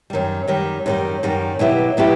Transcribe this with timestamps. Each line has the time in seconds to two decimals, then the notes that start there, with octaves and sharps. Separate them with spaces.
0.10 F#2 D#3 G3
0.48 F#2 D#3 G3
0.86 F#2 D#3 G3
1.23 F#2 D#3 G3
1.59 B2 F#3 B3 E4 G4
1.97 B2 F#3 B3 E4 G4